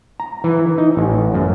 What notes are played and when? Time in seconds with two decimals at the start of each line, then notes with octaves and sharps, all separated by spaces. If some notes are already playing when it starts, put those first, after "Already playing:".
0.20 A#5
0.44 E3
0.78 D#4
0.97 A1
1.34 F#2